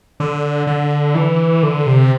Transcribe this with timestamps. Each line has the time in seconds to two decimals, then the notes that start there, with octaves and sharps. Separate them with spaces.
0.20 D3
0.67 D3
1.15 E3
1.63 D3
1.87 C3